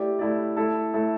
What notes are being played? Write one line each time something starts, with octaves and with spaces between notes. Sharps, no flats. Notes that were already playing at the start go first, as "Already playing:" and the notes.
Already playing: A3 E4 G4 D5
A3 E4 G4 D5
A3 E4 A4
A3 E4 A4